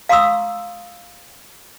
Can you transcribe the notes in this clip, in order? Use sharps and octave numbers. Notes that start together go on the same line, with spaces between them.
F5 A#5 C6 C#6 D#6 E6